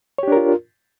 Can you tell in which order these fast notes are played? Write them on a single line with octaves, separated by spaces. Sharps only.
C#5 G4 D4 A#4 F4